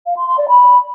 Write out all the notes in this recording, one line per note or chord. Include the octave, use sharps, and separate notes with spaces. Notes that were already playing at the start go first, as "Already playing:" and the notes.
F5
C6
C6
D5
B5